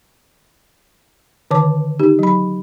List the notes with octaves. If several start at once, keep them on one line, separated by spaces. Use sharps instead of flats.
D3 D#3 B4 C#5 A5 D6
D#4 G4
F#3 B5